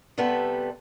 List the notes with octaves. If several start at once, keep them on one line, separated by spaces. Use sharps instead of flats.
C3 G3 A3 B3 A4 B4